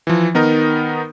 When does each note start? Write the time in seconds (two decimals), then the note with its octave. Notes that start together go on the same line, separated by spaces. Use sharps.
0.07 E3 F3
0.35 D#3 B3 D#4 A#4